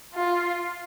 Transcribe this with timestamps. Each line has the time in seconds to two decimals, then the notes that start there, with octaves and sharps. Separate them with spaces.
0.14 F4